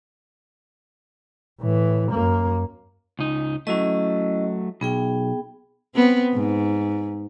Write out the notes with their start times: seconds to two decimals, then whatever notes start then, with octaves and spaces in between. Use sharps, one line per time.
1.61 A2 E3
2.12 F#2 A#3
3.19 C#2 D#4
3.67 F#3 A3 C#4 E4 D#5
4.81 B1 B3 G#4 G5
5.95 B3 C4
6.34 G#2